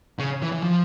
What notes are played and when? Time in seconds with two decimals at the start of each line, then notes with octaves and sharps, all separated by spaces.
0.19 C#3
0.42 E3
0.52 E3
0.63 F3